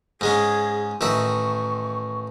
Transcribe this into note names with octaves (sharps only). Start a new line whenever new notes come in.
G#2 G#3 C#4 G#4
A1 D#3 E5 C#6